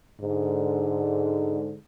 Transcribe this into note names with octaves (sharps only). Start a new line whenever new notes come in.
G#2 D3